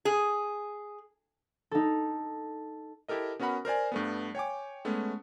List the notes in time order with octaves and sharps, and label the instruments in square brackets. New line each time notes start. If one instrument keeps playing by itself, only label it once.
[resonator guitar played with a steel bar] G#4
[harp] D#4 A4
[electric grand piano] E4 G4 A4 A#4 D#5
B3 C#4 F#4 A#4 F#5 B5
A#4 C5 D5 G#5
G2 A3 B3
C#5 G5 G#5 D6
G#3 A3 B3 C#4